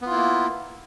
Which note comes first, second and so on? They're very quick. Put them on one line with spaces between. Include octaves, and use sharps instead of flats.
B3 F4 E4 A#3